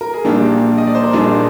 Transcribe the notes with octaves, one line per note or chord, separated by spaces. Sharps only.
A#4
G#4
A#1 A#2 G3 A#3 D4 G4
D#5
D5
C5
A#4
A#1 A#2 G3 A#3 D4 G#4